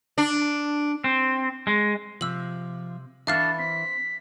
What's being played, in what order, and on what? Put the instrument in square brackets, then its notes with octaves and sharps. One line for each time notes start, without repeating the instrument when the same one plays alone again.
[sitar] D4
[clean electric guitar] C4
G#3
[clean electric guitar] C3 [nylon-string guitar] F3 [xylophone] E6 F#7
[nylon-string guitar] E3 E4 [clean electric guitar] D4 F#4 A4 [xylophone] E5 F5 F6
[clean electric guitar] C4 [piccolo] B6